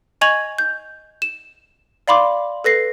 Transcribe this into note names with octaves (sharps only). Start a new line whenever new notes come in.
D#5 G#5 C#6 G#6 F7 F#7
G6
E7
D5 F5 B5 C6 D6
A4 B4 A#6 C7